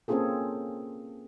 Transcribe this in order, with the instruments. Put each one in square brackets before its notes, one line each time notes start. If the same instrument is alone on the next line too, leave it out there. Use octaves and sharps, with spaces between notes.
[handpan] A#3 C4 C#4 F4 G#4 A4